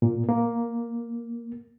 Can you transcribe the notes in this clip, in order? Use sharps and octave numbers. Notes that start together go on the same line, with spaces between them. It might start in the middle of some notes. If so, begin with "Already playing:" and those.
A#2
A#3